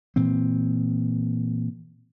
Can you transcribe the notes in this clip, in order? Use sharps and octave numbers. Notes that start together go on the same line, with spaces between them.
A#2 E3 C4